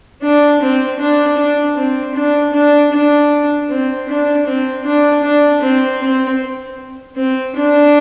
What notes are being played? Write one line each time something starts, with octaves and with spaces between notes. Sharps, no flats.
D4
C4
D4
D4
C4
D4
D4
D4
C4
D4
C4
D4
D4
C4
C4
C4
D4